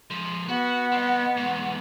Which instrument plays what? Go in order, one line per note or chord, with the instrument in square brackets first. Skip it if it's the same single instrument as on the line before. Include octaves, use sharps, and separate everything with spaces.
[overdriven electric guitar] F3 G#3
[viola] B3 [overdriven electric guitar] F#4 [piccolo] F#5
[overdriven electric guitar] C4 D#5
E2 G#2